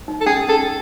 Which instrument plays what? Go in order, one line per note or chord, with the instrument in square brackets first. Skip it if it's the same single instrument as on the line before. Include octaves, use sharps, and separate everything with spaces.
[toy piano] D#4
[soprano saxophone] A4
[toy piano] C#4 [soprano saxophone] G#4
[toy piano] C#4 [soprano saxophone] A4